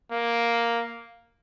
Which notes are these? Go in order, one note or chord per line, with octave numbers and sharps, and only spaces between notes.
A#3